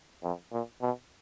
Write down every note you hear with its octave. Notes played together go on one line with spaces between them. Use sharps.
F2
A#2
B2